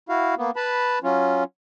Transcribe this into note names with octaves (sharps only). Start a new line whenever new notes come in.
E4 F#4 F5
A#3 B3
B4 A5 B5
F#3 C#4 F4